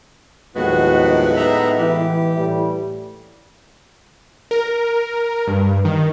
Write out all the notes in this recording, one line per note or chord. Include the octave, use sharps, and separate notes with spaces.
D#2 A2 F3 F#3 G#3 B3 F#4
D#4 E5 A#5
E3 G4
A2 E3 G3
A#4
G2
D#3